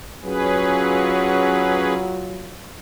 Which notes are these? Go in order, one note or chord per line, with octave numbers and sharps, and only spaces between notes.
F#3 C#4 F4 G#4 B4